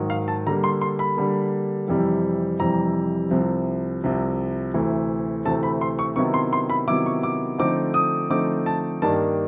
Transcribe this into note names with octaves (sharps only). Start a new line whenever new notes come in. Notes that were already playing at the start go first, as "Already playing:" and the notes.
Already playing: G#2 D#3 F#3
F5
A5
D3 G3 A#3 A#5
C6
C6
B5
D3 G3 A#3
F2 C3 E3 G3
F2 C3 E3 G3 A#5
C2 C3 F3
C2 C3 F3
D2 C3 E3 A3
D2 C3 E3 A3 A5
B5
C6
C#6
C3 D#3 F#3 B3 E4 C#6
C6
C6
B5
C3 D#3 F#3 B3 E4 D6
C#6
D6
D3 F3 A3 C4 D#4 D6
D#6
D3 F3 A3 C4 D#4 D6
A5
G2 D#3 G3 A#3 D4 A5